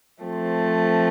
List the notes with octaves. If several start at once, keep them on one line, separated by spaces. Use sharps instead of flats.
F3 A3 C4